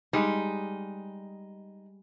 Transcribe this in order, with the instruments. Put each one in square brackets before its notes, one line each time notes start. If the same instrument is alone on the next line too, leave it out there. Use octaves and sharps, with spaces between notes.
[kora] G3 G#3 [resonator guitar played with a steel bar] D#4